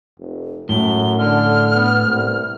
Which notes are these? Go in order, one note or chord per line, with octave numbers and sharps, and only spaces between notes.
F1
F#2 A2 G7
D3 F6
B3
C2